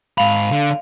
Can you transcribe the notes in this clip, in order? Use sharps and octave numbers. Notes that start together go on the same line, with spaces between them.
G#2 F5 B5
D3